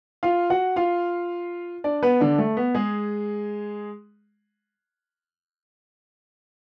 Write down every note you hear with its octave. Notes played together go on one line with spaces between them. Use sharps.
F4 F5
F#4 F#5
F4 F5
D4 D5
B3 B4
D3 D4
A3
B3
G#3 G#4